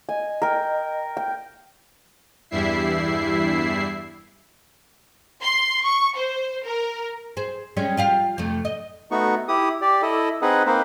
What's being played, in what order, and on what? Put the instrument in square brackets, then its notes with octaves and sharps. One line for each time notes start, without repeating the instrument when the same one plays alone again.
[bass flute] D#5 [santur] G#5
[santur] A#4 G5
G5
[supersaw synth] E2 G2 G3 E4 E5 C7
[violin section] C6
C#6
C5
A#4
[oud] G#4 C5
G3 G#3 C#4
F4 G4 F5
F2 C3 A3
D#5
[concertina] A3 B3 D#4 F#4 C#6
E4 G4 D#6
G4 D5
E4 A4 D#5
C4 D#4 G#4 B4 D#5 F#5
A#3 C4 D#4 B4 C5